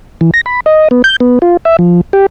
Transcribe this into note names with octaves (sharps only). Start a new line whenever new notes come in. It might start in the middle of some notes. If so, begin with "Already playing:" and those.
E3
A#6
B5
D#5
B3
G6
B3
F4
E5
F3
G4